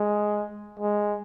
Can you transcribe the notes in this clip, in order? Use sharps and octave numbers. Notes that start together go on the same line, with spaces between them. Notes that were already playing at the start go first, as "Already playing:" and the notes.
Already playing: G#3
G#3